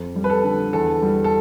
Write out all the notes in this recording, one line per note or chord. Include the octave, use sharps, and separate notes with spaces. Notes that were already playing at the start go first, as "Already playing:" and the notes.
Already playing: F2
G3
B4
A4
D3
E2 A4
G3
A4